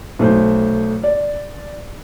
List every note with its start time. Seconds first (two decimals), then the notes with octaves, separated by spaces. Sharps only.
0.19 B1 A3 C5
1.03 D5